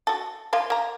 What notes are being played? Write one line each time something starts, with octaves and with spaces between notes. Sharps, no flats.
F#4 A4
F3 A#3 F4
A#3 A#5